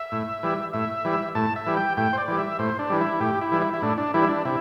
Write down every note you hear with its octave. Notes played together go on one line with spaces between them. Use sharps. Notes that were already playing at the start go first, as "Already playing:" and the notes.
Already playing: E5
A2
E3 G3
A2 E5
E3 G3
A2 A5
E5
E3 G3
G5
A2 G5
C5
D5
E3 G3
E5
A2 C5
D4
E3 G3
E4
A2 G4
E4
E3 G3
E4
E4
A2 D4
D4
E3 G3 E4
D4
C3 E4